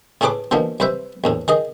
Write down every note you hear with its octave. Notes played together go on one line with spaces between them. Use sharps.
A2 A3 C#4 G#4 B4 D6
B2 D3 E3 F3 A#3
C2 B4 C5 E5
A#1 E2 A2
D#3 G#4 D#5